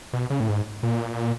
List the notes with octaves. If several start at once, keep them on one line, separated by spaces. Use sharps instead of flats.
B2
C#3
A2
G#2
A#2